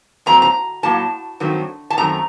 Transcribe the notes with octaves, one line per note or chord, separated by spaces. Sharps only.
A#2 F#3 A3 C4 A#5
A#5
A2 F#3 A#3 A5
G2 D#3 F#3 A3 C4
A5
F#2 D#3 A3 C4 A#5